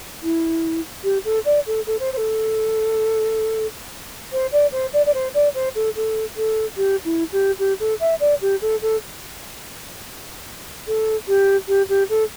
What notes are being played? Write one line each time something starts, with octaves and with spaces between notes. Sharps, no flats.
E4
G4
A4
D5
A4
A4
C5
C5
A4
C5
D5
C5
D5
D5
C5
D5
C5
A4
A4
A4
G4
E4
G4
G4
A4
E5
D5
G4
A4
A4
A4
G4
G4
G4
A4